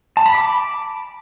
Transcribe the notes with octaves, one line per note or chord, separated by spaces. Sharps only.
A5
B5
D6